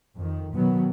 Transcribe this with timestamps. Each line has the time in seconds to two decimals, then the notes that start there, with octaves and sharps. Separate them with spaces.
0.16 F2 D#3
0.54 B2 D#3 F#3 B3